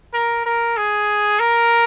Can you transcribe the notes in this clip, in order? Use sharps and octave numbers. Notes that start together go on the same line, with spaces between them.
A#4
A#4
G#4
A#4